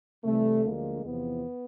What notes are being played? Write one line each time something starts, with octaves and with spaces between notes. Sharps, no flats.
C2 C3 E3 G3 A3
D2 D3 F3 G#3 A#3
E2 C3 F3 B3